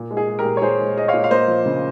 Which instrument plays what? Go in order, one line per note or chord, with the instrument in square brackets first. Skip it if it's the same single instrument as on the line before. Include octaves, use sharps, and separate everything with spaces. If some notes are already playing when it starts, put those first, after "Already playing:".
Already playing: [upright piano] A#2
G#3
G#4
G#3
G4 A#4
A#2
C#5
A#2 G#4 C5
G#3
G#3 D#5
C#5 F5
A#2
F5
A#3 C5 D#5
F3
C#3